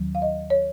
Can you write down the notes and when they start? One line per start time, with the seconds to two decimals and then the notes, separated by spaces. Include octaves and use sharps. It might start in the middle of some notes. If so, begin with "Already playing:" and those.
Already playing: D#2 D#3 F#3
0.15 F5
0.22 D#5
0.50 C#5